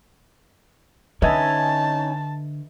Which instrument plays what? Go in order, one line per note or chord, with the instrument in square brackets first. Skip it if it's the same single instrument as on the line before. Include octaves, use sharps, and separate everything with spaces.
[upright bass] D3 [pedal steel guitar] C#4 D#4 G#5 [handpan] B4 D#5 E5 [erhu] A5